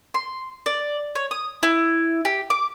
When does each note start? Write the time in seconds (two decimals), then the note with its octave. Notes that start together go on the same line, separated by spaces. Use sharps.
0.14 C6
0.66 D5
1.15 C#5
1.31 D#6
1.63 E4
2.25 G4
2.50 D6